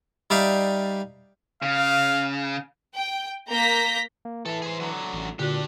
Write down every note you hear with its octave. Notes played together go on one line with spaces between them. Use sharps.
G3 D#4 D5 E5 F5 G5
C#3 F5
G5
A#3 A#5 G6 A#6 B6
A#3
E3 E4 A4
G#4 C5
D3 F#3
A1
A#2 D3 D4 F#4 G4